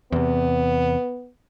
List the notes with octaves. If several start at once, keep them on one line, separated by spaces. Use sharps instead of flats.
E2 C3 B3